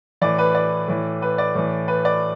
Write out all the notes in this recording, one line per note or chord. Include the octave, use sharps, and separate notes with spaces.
A2 E3 D5
B4
D5
A2 E3
B4
D5
A2 E3
B4
D5